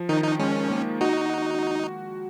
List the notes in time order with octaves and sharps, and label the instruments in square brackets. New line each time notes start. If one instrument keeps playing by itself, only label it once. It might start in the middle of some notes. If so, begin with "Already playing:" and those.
Already playing: [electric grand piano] F3
[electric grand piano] D#3 [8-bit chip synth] D#4
[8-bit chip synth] D#4
[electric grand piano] G#3 [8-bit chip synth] C#4
[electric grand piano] A#3
[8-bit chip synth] D#4 [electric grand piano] F#4